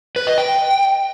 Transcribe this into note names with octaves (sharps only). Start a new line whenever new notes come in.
B4
D#5
G5